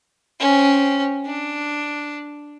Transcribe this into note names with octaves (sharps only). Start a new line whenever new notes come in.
C4 C#4
D4